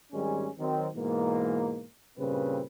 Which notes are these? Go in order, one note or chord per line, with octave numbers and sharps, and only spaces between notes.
G#1 D#3 G3 G#3 C#4 G#4
D#3 F#3 C4
G#2 B2 E3 A#3
G2 A#2 C#3 C4 B4